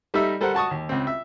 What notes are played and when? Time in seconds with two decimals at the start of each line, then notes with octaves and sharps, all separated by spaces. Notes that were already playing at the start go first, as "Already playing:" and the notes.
0.14 G3 D#4 A4 D#5 E5
0.41 G3 A4 A#4 C5 F#5
0.54 F#4 A5 C#6 D#6
0.71 D#2
0.89 C#2 C4
1.07 E5